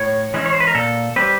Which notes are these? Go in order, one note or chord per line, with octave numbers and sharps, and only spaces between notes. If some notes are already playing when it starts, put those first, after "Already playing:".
Already playing: A2 C#5
E3 G#3 C#4
C#5
C5
B4
A#4
A#2 A4
G3 C4 B4